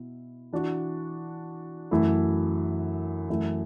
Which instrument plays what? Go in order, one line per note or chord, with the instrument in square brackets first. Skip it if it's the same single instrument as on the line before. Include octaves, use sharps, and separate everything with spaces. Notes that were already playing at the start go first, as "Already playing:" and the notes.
Already playing: [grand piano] B2 E4
E3 D4 F#4
F#2 E3 A3 E4
F#2 E3 A3 E4